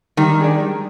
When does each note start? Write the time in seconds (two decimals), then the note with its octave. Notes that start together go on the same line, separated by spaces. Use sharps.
0.17 D#3 G3
0.39 D4 G#4 D5
0.60 G3